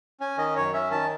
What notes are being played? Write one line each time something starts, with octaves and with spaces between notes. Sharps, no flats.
C#4 G#5
D#3 D#5
F#2 C#5
C#4 E5
D#3 A5